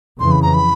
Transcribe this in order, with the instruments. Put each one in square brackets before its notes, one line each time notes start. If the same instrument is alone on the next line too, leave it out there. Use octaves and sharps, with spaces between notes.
[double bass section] F2 C#3 E3 [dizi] C6
[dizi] B5
A#5
B5